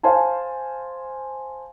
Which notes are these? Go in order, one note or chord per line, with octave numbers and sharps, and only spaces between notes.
C5 F5 G#5 A5 C6